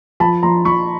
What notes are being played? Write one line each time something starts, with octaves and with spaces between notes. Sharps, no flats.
F3 A5 B5
F3 A#5 C6
F3 B5 C#6